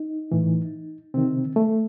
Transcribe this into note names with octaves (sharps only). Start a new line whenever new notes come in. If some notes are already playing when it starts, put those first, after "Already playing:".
Already playing: D#4
A2 E3
C3 D#3 C4
A3